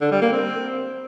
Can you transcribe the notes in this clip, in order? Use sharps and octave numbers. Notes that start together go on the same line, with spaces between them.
D3
G3
A#3
C4